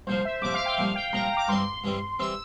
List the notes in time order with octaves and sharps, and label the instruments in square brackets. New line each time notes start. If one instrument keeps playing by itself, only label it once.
[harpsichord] C2 A#2 F3 [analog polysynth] C5
[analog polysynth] E5
[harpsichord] C2 A#2 F3 [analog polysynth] D6
[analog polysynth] F5
G5
[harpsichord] C2 A#2 F3 [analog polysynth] F5
[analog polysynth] G5
[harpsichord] C2 A#2 F3 [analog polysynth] A#5
[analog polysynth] D6
[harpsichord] G2 E3 G3 C4 [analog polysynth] C6
[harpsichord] G2 E3 G3 C4
[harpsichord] E3 G3 C4 [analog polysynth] E6